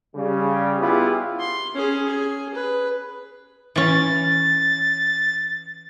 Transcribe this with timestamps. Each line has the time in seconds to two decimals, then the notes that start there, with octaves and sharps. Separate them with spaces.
0.15 C#3 G3
0.80 B3 E4 F4 G4 G#4
1.40 C6
1.75 C#4 G#4
2.05 G#4
2.54 B4
3.76 E3 C#4 A6